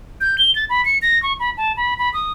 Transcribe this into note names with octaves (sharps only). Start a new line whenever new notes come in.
G6
G7
A6
B5
C#7
A#6
C#6
B5
A5
B5
B5
D#6